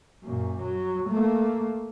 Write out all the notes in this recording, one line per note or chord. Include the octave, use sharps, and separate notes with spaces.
F#2 A#2
F#3
A3 A#3